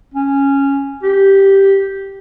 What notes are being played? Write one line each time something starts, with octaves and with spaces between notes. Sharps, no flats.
C#4
G4